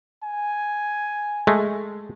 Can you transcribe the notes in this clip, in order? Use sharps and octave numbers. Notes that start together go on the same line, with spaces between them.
G#5
G#3 A3